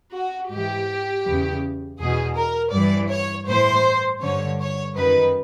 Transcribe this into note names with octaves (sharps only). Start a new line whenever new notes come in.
F#4
G#2 E3 G4
E2 C#3 E3
E2 B2 G#4
A#4
G2 E3 D5
C#5
A2 E3 C5
G2 D3 C#5
C#5
F#2 D#3 B4